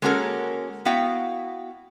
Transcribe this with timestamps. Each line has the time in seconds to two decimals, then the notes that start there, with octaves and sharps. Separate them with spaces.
0.02 G#3 A#3 C#4 F#4 A4 A#4
0.85 B3 E4 F#4 F5 G5